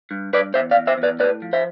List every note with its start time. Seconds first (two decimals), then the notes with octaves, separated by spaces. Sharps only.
0.11 G2
0.33 G2 B4 D5
0.54 E2 C5 E5
0.71 D5 F5
0.76 E2
0.87 C5 E5
0.98 E2
1.03 B4 D5
1.19 A2 B4 D5
1.42 F3
1.53 C5 E5